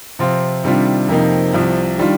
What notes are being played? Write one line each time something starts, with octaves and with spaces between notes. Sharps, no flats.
C3 F3 C4 F4
C3 D#3 G3 D4 F4
F2 C3 F3 A#3 D#4
C2 C3 F3
D#3 G3 D4 F4